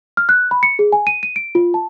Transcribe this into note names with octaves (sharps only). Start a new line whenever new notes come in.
F6
F#6
B5
C#7
G#4
G#5
D#7
D#7
D7
F4
A5